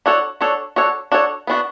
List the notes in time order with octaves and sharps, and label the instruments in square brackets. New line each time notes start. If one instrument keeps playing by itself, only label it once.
[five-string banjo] D4 F#4 A4 C#5
D4 F#4 A4 C#5
D4 F#4 A4 C#5
D4 F#4 A4 C#5
B3 D4 F#4